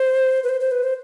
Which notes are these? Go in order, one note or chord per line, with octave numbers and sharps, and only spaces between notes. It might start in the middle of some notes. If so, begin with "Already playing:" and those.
Already playing: C5
B4
C5
C5
B4
C5